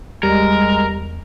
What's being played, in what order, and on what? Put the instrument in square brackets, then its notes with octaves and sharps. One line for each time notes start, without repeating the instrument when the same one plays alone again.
[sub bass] E2 [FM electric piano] G3 [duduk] G#3 [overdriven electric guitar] A#4